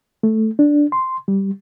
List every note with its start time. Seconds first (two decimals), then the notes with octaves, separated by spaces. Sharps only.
0.23 A3
0.59 D4
0.92 C6
1.28 G3